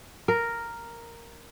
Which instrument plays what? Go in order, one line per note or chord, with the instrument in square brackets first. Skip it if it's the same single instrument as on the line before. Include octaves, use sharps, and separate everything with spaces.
[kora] A#4